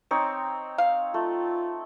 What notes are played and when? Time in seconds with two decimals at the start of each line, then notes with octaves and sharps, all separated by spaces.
0.11 C4 D#4 C#5
0.78 F5
1.14 A3 F4